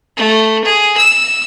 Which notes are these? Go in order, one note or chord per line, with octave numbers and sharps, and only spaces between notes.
A3
G#4
E6